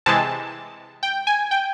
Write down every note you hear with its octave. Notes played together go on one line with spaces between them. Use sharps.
C3 E3 G#3 A5
G5
G#5
G5